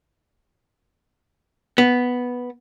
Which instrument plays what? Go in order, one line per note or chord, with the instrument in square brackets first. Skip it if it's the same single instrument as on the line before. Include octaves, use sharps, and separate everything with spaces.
[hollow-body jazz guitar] B3